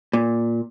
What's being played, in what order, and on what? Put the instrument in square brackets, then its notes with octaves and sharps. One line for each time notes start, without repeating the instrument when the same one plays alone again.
[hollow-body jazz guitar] A#2